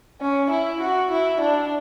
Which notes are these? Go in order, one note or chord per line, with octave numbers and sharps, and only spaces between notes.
C#4
E4
F#4
E4
D4